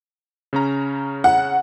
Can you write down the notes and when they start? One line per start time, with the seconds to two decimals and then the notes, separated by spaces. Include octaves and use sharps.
0.53 C#3 C#4 A#5
1.24 F#5